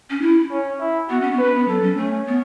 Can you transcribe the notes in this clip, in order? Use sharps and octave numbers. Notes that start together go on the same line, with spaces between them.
C#4
E4
C#4
E4
B3 F#4
C#4
B3
C#4 B4
B3
F#3 A4
C#4
A3 C#4
B3